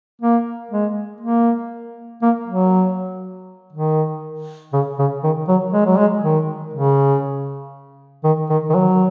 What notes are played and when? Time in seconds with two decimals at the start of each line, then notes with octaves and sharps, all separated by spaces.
0.22 A#3
0.71 G#3
1.21 A#3
2.22 A#3
2.48 F#3
3.73 D#3
4.73 C#3
4.99 C#3
5.23 D#3
5.48 F#3
5.73 G#3
5.86 F#3
5.98 G#3
6.23 D#3
6.74 C#3
8.24 D#3
8.50 D#3
8.70 D#3
8.75 F#3